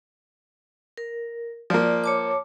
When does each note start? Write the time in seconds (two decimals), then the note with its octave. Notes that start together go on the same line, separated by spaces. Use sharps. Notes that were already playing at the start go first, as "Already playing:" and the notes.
0.97 A#4
1.70 F3 A#3 D5
2.04 C#5 A5 D6